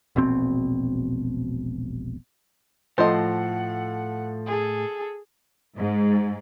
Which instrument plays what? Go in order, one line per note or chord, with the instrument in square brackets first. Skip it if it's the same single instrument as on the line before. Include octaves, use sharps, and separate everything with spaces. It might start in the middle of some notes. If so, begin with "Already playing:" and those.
[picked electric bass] E1 A#1 B2 C4
[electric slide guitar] A2 [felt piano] F3 A3 [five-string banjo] C5 D#5 [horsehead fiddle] F#5
[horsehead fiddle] G#4 A4
[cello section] G#2